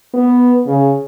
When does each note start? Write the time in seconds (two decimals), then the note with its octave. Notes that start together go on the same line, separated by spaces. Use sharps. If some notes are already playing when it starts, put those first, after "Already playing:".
0.14 B3
0.67 C#3